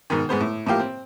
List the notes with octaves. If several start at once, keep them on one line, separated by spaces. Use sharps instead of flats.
G#2 B2 D#3
G#2 G#3 B3 C5
A2
A2 F3 A#3 G4 F5
C4